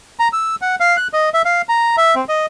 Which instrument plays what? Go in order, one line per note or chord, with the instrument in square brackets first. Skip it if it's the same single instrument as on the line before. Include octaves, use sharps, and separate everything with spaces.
[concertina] A#5
E6
F#5
F5
F#6
D#5
E5
F5
A#5
E5
C4
D#5